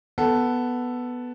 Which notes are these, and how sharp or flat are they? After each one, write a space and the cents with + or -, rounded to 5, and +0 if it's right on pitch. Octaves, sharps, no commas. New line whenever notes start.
B3 +0 A4 +0